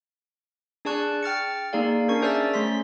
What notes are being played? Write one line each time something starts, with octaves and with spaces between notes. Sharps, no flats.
D4 G#4 D5 A5 C#6 F#6
G5 F6 A6 C#7
A#3 D#4 G#4 D5 F5
C#4 D4 A#4 C#6
G#4 C5 D5 E5 E6 A6
A3 C#4 C6 B6